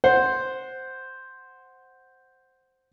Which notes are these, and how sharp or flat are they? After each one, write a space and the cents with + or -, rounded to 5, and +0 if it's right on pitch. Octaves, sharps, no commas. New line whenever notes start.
C5 +0 F#5 +0